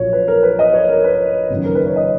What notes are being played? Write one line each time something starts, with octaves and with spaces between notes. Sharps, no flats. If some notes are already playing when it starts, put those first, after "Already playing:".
Already playing: A#1 A#2 F#3 C#5
B4
A#4
B4
D#5
C#5
A#4
B4
F#1 F#2 D#3
A#4
B4
C#5
D#5